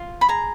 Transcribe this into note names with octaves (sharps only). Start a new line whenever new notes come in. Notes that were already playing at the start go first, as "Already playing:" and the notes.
Already playing: F4
B5
G#4 A#5